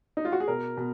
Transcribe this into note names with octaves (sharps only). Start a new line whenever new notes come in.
D#4
F4
F#4
G#4
B2 A#4
B2